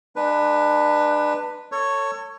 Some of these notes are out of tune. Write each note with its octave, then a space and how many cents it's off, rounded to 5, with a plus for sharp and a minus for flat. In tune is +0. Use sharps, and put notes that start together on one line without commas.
G#3 +0 D4 +30 B4 +0
A4 +30 C#5 +0